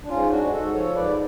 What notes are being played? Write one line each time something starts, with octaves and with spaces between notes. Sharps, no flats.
D4
G#2 C#4 F4
G#3 D4 F#4
G#2 F#4 A4
F3 A4 C#5
G#2 B4 D5